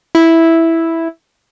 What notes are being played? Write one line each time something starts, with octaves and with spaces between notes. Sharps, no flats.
E4